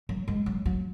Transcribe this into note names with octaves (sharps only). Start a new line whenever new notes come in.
F#3
G#3
F#3
F#3